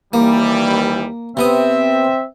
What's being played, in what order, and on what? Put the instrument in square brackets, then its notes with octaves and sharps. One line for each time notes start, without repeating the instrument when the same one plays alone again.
[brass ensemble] D#2 E3 G3 [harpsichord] A#3
[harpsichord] C3 B3 D#6 [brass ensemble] C4 E5